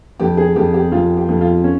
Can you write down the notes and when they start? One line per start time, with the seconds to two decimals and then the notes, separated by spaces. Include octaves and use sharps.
0.20 F2 G4
0.37 G#4
0.56 F2 G4
0.74 G4
0.92 F2 F4
1.17 G4
1.29 F2
1.41 F4
1.64 C#4